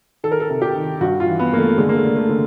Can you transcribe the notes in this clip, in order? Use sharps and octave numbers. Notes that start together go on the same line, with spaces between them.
D#3 A4
A#4
A4
C3
G4
D#3
G2 F#4
F4
E3
B3
G2 A#3
A3
D3 G#3
A#3
A3
D3
A3
D3